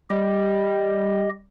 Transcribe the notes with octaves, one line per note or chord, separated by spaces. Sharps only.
G3 G4 D#5